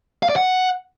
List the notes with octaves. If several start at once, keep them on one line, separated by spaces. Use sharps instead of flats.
F5
D5
F#5